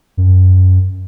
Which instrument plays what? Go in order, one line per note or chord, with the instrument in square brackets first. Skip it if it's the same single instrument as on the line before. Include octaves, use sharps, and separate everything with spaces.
[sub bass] F#2